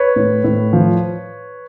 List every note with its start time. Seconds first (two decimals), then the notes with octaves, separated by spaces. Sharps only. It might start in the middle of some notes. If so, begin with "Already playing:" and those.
Already playing: B4 C#5
0.16 A2
0.44 A2
0.73 F3